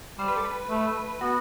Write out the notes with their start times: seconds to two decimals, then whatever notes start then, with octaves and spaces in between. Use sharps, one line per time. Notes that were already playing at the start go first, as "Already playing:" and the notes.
0.19 G3 C5
0.28 B4
0.36 A4
0.45 B4
0.70 A3
1.21 B3 F#4